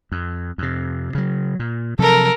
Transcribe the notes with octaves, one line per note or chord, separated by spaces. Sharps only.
F2
F2 C3
C#3 F#3
A#2
C3 F3 F#3 A4 A#4